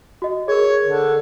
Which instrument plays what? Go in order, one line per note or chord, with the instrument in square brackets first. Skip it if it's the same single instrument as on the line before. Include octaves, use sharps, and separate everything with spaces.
[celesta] F#4 D#5
[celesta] G#4 A#4 [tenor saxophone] C#5
[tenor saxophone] D3